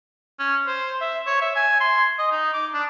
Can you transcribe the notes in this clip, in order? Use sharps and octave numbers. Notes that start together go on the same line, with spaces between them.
C#4
C5
E5
C#5
E5
G#5
C6
D#5
D#4
D6
D4